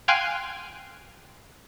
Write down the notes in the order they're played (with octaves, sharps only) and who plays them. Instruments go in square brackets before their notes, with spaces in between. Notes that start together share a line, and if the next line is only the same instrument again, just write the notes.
[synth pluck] F5 G5 G#5 C6 F6 F#6